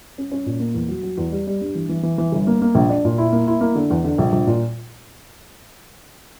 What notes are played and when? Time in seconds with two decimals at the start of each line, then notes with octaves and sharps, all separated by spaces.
0.18 C#4
0.31 C#4
0.46 A#2
0.60 A#3
0.74 E2
0.89 F#3
1.03 F#3
1.18 E2
1.32 G3
1.47 G3
1.61 G2
1.75 E3
1.89 E3
2.03 E3
2.18 E3
2.32 G1
2.47 A#3
2.62 A#3
2.75 A#1
2.89 D4
3.05 A#2
3.18 E4
3.32 A#3
3.48 E4
3.61 A#3
3.75 D3
3.91 E2
4.04 D3
4.18 A#1
4.32 A#1
4.47 A#2